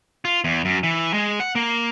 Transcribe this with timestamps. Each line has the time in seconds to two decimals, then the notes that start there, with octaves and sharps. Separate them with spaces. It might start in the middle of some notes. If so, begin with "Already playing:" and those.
0.25 F4
0.44 E2
0.65 F#2
0.83 E3
1.14 G#3
1.40 F#5
1.55 A#3